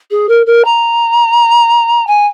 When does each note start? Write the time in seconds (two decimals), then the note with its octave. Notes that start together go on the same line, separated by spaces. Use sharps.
0.11 G#4
0.29 A#4
0.46 A#4
0.65 A#5
2.07 G#5